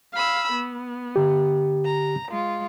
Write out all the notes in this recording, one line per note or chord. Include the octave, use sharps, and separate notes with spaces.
F5 B5 E6
B3
D3 G4
A#5
G#3 F4